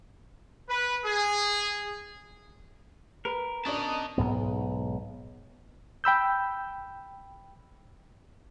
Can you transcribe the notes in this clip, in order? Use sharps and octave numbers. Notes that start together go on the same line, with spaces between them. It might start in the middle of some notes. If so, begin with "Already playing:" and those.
B4
G#4
A#4 B4
C#4 D4 D5 D#5 A5
B1 G#2 B3
G5 B5 E6 G6